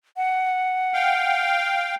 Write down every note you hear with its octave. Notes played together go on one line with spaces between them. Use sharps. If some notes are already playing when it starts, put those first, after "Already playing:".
F#5
F5 G5